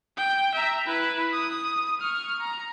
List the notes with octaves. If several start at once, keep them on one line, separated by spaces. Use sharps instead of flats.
G5
E5 A#5
E4 B4
D#6
C#6 F6
A#5